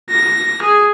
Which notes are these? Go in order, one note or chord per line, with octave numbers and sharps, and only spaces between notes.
A#6
G#4